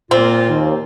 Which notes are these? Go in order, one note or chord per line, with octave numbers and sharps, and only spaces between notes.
A#2 A#3 C4 F4
D#2